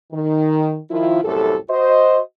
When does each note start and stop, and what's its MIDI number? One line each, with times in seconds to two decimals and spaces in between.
0.13 0.77 51
0.90 1.19 51
0.90 1.19 53
0.90 1.19 64
0.90 1.19 65
1.24 1.58 36
1.24 1.58 42
1.24 1.58 45
1.24 1.58 67
1.24 1.58 69
1.69 2.20 66
1.69 2.20 72
1.69 2.20 75